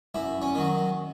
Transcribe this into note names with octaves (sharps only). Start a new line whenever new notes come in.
F#2 E4
C#4
D#3 F#3